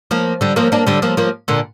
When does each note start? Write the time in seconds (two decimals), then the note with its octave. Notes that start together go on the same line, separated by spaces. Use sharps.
0.11 F3 A#3
0.41 D3 G3
0.56 F3 A#3
0.72 A#3 D4
0.87 D3 G3
1.02 F3 A#3
1.17 F3 A#3
1.48 A#2 D3